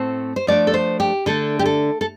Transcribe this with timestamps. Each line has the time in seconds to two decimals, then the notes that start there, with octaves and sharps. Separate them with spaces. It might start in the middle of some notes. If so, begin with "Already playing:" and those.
Already playing: A2 A3 C4 C5
0.36 C5
0.47 F3 A3 D4 D5
0.67 A4
0.74 C5
1.00 G4
1.26 D3 A3 D4 A4
1.59 G4
1.66 A4
2.01 A4